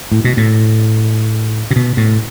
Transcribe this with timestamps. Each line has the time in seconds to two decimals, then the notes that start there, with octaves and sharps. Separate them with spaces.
0.12 A2
0.25 B2
0.37 A2
1.71 C3
1.76 B2
1.97 A2